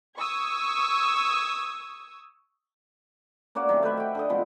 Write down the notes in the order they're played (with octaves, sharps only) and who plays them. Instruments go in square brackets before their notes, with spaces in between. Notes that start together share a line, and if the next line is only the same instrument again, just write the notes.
[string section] C#6 D#6 E6 G#6
[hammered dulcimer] A#3 C#4 F#4 D5
D#3 F#3 A3 C4
A3 G4 B4 E5
F#4 G5
D3 A4 D#5
C3 F3 G#3 B3